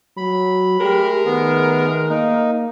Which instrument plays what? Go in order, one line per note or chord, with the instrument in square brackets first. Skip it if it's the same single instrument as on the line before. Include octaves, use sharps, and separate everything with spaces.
[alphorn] F#3 [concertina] B5
[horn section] G#3 A3 A#4 [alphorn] G4
[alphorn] D#3 [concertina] B3
[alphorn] A#3 [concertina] D#4